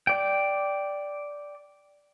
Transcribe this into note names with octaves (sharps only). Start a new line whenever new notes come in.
D5 G5